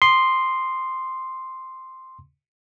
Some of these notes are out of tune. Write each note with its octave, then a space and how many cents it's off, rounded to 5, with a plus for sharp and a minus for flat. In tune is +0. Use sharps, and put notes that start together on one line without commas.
C6 +0 D#6 -30